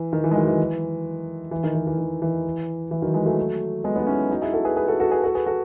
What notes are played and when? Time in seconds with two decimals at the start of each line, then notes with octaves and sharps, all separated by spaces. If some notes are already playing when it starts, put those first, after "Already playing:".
Already playing: E3
0.13 D#3
0.24 E3
0.31 G#3
0.36 D#3 F#3
0.47 E3
1.51 E3
1.64 D#3
1.75 E3
1.87 E3
1.98 D#3
2.22 E3
2.91 E3
3.02 D#3 F#3
3.14 E3 G#3
3.25 F#3 A3
3.84 G#3 B3
3.95 B3 D#4
4.07 C#4 E4
4.30 D#4 F#4
4.42 E4 G#4
4.53 F#4 A4
4.65 G#4 B4
4.76 G#4 B4
4.88 F#4 A4
5.00 F#4 A4
5.12 G#4 B4
5.23 F#4 A4
5.35 G#4 B4
5.46 F#4 A4